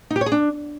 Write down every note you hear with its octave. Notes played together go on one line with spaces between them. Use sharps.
D#4
G4
C#5
G#4
D4